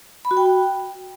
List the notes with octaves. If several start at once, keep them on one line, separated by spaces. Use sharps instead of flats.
B5
F#4
G5